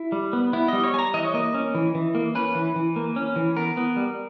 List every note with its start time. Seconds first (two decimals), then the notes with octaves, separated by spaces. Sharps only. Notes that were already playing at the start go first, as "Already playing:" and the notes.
Already playing: E4
0.12 G3
0.33 B3
0.53 B3 E4
0.68 G3 D#5
0.84 C#5
0.94 G3 G#5
0.99 A#5
1.14 E3 D#5
1.24 C#5
1.34 A#3 D#5
1.54 C#4
1.75 E3
1.95 E3
2.15 A#3
2.35 C#4 B4
2.55 E3
2.76 E3
2.96 A#3
3.16 C#4
3.36 E3
3.57 B3 A#4
3.77 B3
3.96 G3